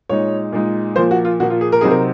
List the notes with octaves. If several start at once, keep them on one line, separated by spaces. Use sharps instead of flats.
A#2 G#3 D#4 C#5
A#2 G#3 D#4
A#2 F3 A#3 C5
F#4
F4
A#2 F3 A#3 F#4
F4
G#4
A#4
C3 F#3 C4 D#4 G#4
A#4